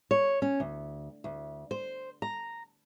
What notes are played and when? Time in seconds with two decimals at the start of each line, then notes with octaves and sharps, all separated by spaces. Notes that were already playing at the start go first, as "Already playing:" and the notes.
0.11 C#5
0.42 C#4
0.60 D2
1.24 D2
1.71 C5
2.22 A#5